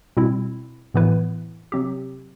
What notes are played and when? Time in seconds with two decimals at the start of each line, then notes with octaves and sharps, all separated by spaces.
0.17 B2 G3 C4 E4
0.94 A2 E3 B3 E4 B4
1.72 C3 F#3 C4 G4